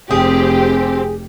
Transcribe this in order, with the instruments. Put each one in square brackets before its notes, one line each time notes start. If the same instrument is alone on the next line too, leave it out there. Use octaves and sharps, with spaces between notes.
[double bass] F1 [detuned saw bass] C4 [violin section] G4 [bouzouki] G#4